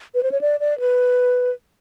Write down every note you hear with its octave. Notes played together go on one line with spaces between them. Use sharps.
B4
C5
C#5
D5
D5
B4